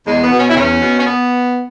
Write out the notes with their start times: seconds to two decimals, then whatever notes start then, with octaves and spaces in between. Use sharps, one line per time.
0.06 E2 G#3
0.23 B3
0.31 B2
0.39 C#4
0.49 E4
0.55 E2 C#4
0.81 B2
0.98 C#4
1.06 B3